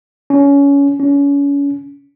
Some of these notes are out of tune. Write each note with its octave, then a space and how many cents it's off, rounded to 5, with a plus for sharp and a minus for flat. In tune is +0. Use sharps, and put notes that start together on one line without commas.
C#4 +20
C#4 +30